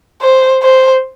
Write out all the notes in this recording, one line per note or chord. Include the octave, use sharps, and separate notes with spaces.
C5
C5